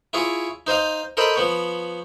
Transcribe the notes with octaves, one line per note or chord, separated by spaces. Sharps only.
E4 F4 G#4 C#5
D#4 C5 D#5 F5
A4 A#4 C5 D#5 B5
F3 B3 C#5